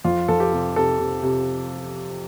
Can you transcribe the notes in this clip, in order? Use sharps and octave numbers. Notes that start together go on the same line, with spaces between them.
F2 F4
F2 A4
G4
C3
C3 A4
C3
C3